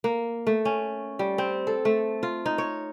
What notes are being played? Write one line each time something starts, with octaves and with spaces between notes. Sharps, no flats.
A#3
A3
C#4
G3
C4
A4
A3
F4
D#4
C#5